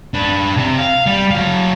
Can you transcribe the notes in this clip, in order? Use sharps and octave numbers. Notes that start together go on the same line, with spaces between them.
D4 B4
C3
F5
G3
F#3 F5